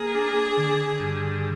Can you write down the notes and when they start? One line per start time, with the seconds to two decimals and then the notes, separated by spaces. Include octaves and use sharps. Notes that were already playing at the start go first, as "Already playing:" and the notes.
Already playing: A#3 G#4
0.15 D4
0.57 D3
1.00 G2